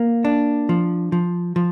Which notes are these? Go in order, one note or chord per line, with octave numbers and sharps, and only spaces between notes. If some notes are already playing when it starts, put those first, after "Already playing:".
Already playing: A#3
D4
F3
F3
F3